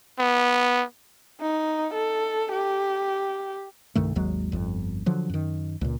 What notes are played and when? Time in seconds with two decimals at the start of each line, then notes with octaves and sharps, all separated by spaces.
0.19 B3
1.41 D#4
1.94 A4
2.52 G4
3.95 C2 G2 D#3 A3
4.15 G#1 D#2 F#3 G#3
4.52 G1 F2
5.06 D3 F3 F#3
5.30 F#2 D#3
5.81 C#2 A#2